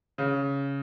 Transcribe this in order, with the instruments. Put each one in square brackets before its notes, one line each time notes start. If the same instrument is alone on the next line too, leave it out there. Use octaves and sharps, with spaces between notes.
[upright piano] C#3